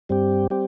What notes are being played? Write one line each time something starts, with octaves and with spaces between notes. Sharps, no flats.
G2 G3 C4 G4
G3 C4 G4